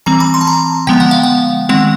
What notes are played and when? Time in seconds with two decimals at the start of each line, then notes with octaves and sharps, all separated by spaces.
0.06 E3 G3 C4 A#5
0.20 B5
0.34 C6
0.41 A5
0.47 A#5
0.87 D3 F3 G#3 B3 G5
1.00 F#5
1.11 F5
1.23 F#5
1.69 D#3 G#3 C4 F#5